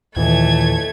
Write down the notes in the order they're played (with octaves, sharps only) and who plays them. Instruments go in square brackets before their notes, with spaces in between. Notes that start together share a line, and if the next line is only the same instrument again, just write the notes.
[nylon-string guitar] D#2 A#2 E3 [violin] A3 G#6